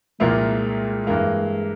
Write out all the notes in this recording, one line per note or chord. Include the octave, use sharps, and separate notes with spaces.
C2 A#2 F3 G#3 A#3 E4
G2 E3 A#3